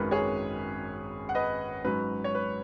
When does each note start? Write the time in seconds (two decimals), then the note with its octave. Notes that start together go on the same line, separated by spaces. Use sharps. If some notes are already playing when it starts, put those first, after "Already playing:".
Already playing: G#1 F#2 D#3 G#3 C#4 B4
0.11 G#4 C#5
1.29 F#5
1.35 B4 D#5
1.84 G#2 F#3 C#4 B4
2.24 C#5
2.35 B4